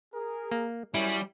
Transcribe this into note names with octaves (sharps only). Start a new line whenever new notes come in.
G#4 A#4
A#3
F#2 G3 C#4 E4